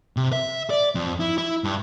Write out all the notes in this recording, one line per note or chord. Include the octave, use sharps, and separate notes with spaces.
C3
E5
D5
F2
E4
E4
G2